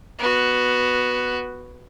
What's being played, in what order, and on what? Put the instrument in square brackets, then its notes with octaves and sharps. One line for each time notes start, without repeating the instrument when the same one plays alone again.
[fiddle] B3 F#4